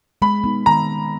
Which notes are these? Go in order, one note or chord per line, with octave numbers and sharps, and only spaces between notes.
G#3 B5
B3 D#4
D#3 A#5